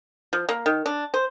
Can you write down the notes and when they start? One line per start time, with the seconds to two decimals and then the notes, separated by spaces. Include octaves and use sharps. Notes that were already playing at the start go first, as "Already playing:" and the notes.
0.33 F3
0.49 A#3
0.66 D#3
0.86 D4
1.14 C5